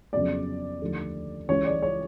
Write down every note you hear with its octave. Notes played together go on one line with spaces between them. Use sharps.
F2 C#3 F#3 B3 D5
D#2 D3 F3 A3
C#2 C#3 E3 G3 C#5
D5
C#5